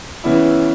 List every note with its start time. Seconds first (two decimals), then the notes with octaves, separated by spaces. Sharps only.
0.24 C#3 E3 B3 E4